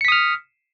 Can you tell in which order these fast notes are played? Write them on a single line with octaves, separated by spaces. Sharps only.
C#7 B6 D#6 F6